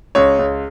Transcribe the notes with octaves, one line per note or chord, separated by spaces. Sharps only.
C#2 C#5
C#2